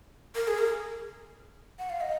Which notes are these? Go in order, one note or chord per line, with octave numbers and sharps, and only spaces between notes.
A#4
G#4
A#4
F#5
F5
D#5